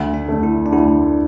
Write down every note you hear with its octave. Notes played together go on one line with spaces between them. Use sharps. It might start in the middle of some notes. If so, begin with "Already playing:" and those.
Already playing: D2
D4
D3 A3
E4
D4
D2 E4